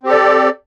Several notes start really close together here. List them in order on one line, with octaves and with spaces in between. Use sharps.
C4 G4 A4 D5